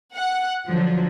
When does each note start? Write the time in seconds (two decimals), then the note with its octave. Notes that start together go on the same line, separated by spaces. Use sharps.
0.14 F#5
0.69 D3 F3 F#3